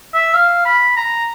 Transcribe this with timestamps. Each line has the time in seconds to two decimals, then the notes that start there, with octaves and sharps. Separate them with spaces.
0.14 E5
0.34 F5
0.65 B5
0.97 A#5